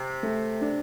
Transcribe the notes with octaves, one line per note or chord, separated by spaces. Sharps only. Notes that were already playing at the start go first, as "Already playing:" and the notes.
Already playing: C3
A3
D4